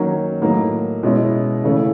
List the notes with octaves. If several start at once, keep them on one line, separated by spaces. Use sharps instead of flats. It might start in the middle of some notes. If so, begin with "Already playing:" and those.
Already playing: D#3 F#3 A#3 C#4
A2 F#3 A#3 D#4
B2 G#3 C#4 E4
C#3 E3 A3 C#4